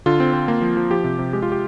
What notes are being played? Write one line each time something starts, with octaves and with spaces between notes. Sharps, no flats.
D3 F4
C4
C4
A#3
F3
F3
F3 G4
C3
C3
G#3 G4
F4
G4